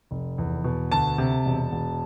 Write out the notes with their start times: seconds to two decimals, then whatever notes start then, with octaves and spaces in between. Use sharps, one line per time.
0.11 F1
0.38 E2
0.64 B2
0.91 D2 A5
1.18 C3
1.45 E1
1.72 E1